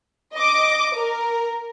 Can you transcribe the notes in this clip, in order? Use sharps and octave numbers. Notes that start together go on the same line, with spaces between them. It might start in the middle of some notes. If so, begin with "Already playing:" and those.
D#5 D6
A#4